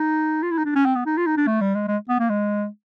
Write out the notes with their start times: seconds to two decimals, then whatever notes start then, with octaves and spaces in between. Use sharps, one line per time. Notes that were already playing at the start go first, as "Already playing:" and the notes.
Already playing: D#4
0.43 F4
0.51 E4
0.58 D#4
0.65 D4
0.76 C#4
0.85 C4
0.96 B3
1.06 D#4
1.17 F4
1.26 D#4
1.37 D4
1.47 A3
1.61 G3
1.75 G#3
1.88 G#3
2.09 B3
2.20 A#3
2.30 G#3